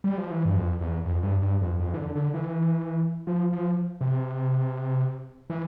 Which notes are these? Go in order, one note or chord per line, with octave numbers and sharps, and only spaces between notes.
G3
F3
E3
G2
F2
E2
F2
G2
G2
F2
F2
E3
D3
D3
E3
F3
F3
C3
E3